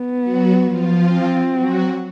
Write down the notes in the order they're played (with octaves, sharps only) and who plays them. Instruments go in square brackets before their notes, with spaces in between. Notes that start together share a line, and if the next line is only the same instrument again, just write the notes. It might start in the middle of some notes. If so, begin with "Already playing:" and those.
Already playing: [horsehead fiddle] B3
[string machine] F#3 F#4
F3 F4
[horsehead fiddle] C4
[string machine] F#3 F#4